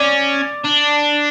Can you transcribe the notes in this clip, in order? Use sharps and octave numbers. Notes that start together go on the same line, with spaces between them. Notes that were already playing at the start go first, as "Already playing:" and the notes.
Already playing: C#4 D5
D4